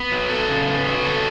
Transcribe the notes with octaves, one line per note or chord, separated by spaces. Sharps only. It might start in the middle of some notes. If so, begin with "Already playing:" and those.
Already playing: B3
F#3
A4
C#3
B3
F#3
A4